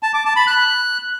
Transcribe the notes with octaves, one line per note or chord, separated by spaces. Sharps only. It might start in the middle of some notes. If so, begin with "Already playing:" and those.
A5
D6
A5
B5
F#6